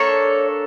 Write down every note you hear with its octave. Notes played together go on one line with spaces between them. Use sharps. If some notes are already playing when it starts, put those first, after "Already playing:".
Already playing: A#3 D4 A4 C#5